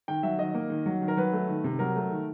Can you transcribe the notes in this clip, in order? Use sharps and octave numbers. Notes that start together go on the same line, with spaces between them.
D#3 G5
F#3 E5
D#3 D#5
A#3
D#3
F#3
D#3
A#4
F#3 B4
A3
D#3
C3
F#3 A#4
A3
D#3